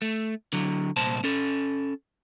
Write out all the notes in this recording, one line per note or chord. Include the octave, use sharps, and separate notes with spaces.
A3
D3 F#3
C2 A#2 C5 A5
C#4 A4